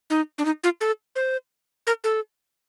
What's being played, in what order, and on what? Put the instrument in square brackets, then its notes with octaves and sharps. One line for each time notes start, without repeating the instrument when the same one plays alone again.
[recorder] D#4
D4
D#4
F4
A4
C5
A#4
A4